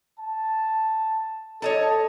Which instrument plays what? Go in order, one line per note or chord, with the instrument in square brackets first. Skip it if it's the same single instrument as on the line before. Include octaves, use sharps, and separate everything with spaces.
[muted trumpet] A5
[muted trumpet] A4 [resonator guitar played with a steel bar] C#5 D#5 A5